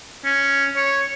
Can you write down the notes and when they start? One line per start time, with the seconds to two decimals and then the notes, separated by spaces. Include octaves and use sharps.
0.25 C#4
0.76 C#5